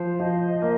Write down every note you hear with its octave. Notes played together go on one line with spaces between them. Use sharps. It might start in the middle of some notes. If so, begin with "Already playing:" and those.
Already playing: F3 C5
F3 D#5
A#3 C5